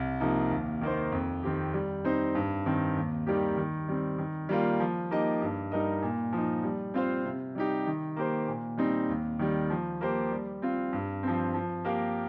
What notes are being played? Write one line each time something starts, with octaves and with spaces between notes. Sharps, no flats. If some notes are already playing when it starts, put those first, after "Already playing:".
Already playing: C2
C3 F3 A#3 D#4
D#2
D#3 A#3 D#4 C5
F2
D#3 C4 G4
G3
C4 D#4 C5
G2
D#3 C4
D#2
D#3 G3 A#3 G4
D#3
G3 C4
D#3
G3 A#3 F4
F3
A#3 D#4 G4 D#5
G2
G3 D#4 A#4 D#5
A#2
F3 D#4
G3
C4 F4 C5 F5
C3
G3 D#4 G4
D#3
A#3 G4 C5
A#2
G3 C4 D#4
D#2
D#3 G3
F3
A#3 G4 C5
G3
C4 F4
G2
F3 C4
F3
A#3 G4 A#4 F5